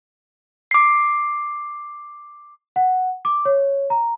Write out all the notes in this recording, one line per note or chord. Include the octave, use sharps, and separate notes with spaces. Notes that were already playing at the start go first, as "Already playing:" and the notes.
D6 C7
F#5
D6
C#5
A#5